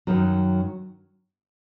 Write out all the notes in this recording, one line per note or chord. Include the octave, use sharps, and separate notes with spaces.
F#2 D#3 F#3